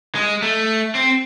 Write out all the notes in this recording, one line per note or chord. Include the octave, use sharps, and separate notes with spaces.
G#3
A3
C4